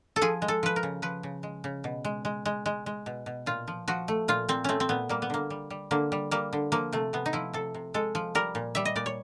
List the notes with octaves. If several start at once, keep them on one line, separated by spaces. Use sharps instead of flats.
A4
F3 G#4
G#3
A4
F3 B4
A#4
C#3
F3 B4
C#3
G#3
C#3
B2
G#3
G#3
G#3
G#3
G#3
B2
B2
A#2 F4
F3
F3 F#4
A3
A#2 F4
A#2 C4
A3 C4 C#4
C4
A#2 B3
G3 A#3
B3
D3 A#3
G3
G3
D3 A#3
G3
G3 A#3
D3
F3 A#3
C3 A3
C3 B3
D#4
F3 E4
C3 A4
C3
G#3 A4
F3
G3 A#4
A#2
G3 E5
D#5
A#2 D5
C#5